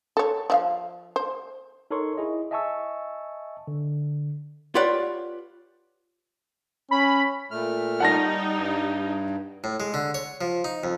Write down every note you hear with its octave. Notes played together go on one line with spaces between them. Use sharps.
A4 C#5
F3 E5 F5
C5
D#4 A4 A#4 C#5 C6 C#6
E4 G#4 D#5
D#5 E5 G#5 A5 C#6 E6
D3
F4 G4 B4 C#5 D5 F#5
C#4 B5
A#2 A3 F6
G3 D#4 F#5 A5 A#6
G2
A2
G#3
D3
C#5
F3
D#4
F2